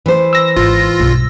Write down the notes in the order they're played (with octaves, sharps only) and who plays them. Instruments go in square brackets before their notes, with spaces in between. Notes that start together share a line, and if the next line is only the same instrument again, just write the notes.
[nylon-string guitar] E3 C5
[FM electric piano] E6 A#6
[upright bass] G#1 [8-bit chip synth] F4
[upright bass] B1 G2